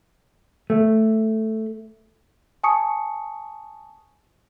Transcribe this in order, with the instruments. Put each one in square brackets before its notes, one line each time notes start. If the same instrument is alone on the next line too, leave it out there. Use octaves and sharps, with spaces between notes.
[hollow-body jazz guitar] A3
[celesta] G#5 A5 C#6 D#6 C#7